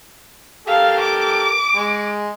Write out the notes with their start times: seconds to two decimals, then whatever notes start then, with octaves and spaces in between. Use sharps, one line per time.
0.67 G4 A4 A#4 F5
1.00 D6
1.76 G#3